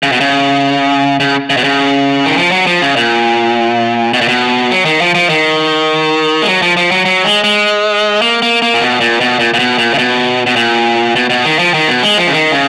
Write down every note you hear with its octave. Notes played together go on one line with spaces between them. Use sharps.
C#3
B2
C#3
C#3
C#3
B2
C#3
D#3
F3
F#3
F3
C#3
A#2
B2
A#2
B2
F#3
D#3
F3
F3
D#3
G#3
F#3
F3
F3
F#3
F#3
G#3
G#3
A#3
A#3
A#3
A#2
B2
A#2
B2
A#2
A#2
B2
A#2
C#3
B2
B2
A#2
B2
B2
D#3
F3
D#3
B2
G#3
F3
C#3
D#3
C#3